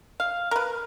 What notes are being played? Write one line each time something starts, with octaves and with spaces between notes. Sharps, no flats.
F5
A#4 B4